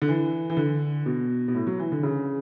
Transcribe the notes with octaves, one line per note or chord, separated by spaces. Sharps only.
D3
E3
E3
D3
B2
B2
A2
F#3
E3
D3
C#3